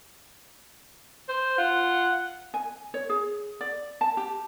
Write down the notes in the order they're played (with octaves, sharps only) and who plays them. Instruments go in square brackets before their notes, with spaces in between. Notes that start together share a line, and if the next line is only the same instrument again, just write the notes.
[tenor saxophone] C5
[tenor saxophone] F4 [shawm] F#5
[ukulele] G#5
C#5
G#4
D5
A5
G4